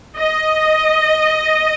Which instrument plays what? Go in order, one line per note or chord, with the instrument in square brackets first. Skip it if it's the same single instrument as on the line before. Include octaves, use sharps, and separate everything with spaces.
[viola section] D#5